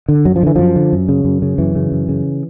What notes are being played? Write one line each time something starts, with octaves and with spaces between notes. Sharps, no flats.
D3
F#2 F#3
F3
D3 E3
F#2 F3
D3
F#2
C#3
F#2
C#3
F#2 E3
C#3
F#2
C#3